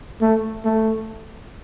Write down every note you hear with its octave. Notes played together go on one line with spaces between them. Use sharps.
A3
A3